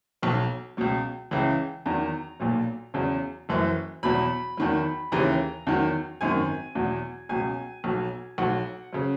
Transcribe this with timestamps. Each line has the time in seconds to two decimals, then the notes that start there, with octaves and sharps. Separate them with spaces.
0.23 B1 B2 F#3
0.77 C#2 B2 F#3
1.31 C#2 C#3 E3
1.86 E2 D#3 F#3 A#5
2.40 B1 A#2 F#3
2.94 E2 C#3 F#3
3.49 F#1 F#2 E3
4.03 E2 B2 F#3 B5
4.57 E2 D#3 F#3
5.12 D#2 C#3 E3 A#5
5.67 E2 D#3 F#3
6.21 G#1 F#2 D#3 G#5
6.75 E2 B2 F#3
7.29 C#2 B2 F#3 G#5
7.84 B1 B2 F#3
8.38 B1 B2 F#3 F#5
8.93 C#3 F#3